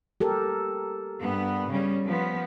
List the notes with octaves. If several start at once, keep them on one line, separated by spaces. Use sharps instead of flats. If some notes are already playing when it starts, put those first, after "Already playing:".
G4 A4 A#4
G2 B3
C#3 G3 C#4
F3 B3